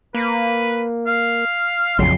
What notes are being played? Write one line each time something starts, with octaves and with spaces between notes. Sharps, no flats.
A#3 B4
F5
A#1 F2 C#3 F#3 C6